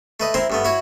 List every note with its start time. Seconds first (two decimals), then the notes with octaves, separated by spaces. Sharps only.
0.20 A3 B4 D#5
0.34 C4 E4 A#4 C5
0.50 G2 A3 B3
0.65 E4 F#4 C#5